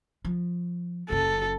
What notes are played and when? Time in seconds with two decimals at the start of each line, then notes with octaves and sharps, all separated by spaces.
0.25 F3
1.10 F#1 C#3 A4